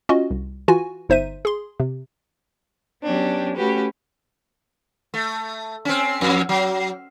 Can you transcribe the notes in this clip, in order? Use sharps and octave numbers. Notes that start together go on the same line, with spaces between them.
C#4 F4 F#4 D#5
C2
E3 F4 F#4 G#5
G1 D#4 C5 E5 D#7
G#4 C6
C3
F#3 B3 C#4 D4 G4
A3 C#4 F#4 G4 B4
A3
C4 C#4
F2
F#3